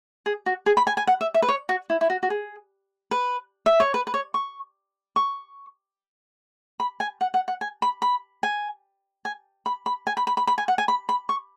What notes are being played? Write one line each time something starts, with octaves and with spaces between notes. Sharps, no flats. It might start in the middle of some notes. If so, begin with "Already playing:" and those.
G#4
F#4
G#4
B5
G#5
G#5
F#5
E5
E5
B4
C#5
F#4
E4
E4
F#4
F#4
G#4
B4
E5
C#5
B4
B4
C#5
C#6
C#6
B5
G#5
F#5
F#5
F#5
G#5
B5
B5
G#5
G#5
B5
B5
G#5
B5
B5
B5
B5
G#5
F#5
G#5
B5
B5
C#6